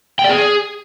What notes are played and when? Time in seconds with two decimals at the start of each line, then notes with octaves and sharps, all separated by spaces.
0.19 G5
0.24 D5
0.29 G#4